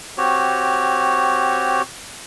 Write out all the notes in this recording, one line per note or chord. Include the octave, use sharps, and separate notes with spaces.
C4 F#4 G4 C#5